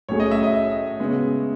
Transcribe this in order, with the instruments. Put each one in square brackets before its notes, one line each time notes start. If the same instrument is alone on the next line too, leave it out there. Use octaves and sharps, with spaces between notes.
[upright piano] A2 F#3 A3 C#4 G#4 [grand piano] C#5
[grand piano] D#5
E5
D#5
D#5
[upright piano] C#3 G#3 B3